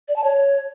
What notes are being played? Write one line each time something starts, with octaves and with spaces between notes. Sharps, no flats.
D5
A5
C#5